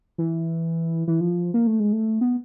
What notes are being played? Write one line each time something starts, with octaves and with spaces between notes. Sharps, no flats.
E3
E3
F3
A#3
A3
G#3
A3
B3